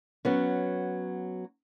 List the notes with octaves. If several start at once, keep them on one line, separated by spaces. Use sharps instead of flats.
F#3 B3 C#4